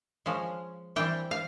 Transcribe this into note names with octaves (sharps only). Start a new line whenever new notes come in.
F3 G#3 C#4
E3 G3 C4 G5
F5